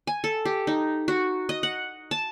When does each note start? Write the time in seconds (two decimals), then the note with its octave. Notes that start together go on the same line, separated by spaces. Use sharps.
0.07 G#5
0.24 A4
0.45 G4
0.67 D#4
1.08 F#4
1.49 D#5
1.63 F#5
2.11 A5